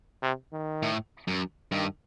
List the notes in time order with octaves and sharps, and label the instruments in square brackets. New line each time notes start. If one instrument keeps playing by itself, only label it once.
[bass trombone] C3
D#3
[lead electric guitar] A2
F#2
[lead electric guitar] G2 [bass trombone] D#3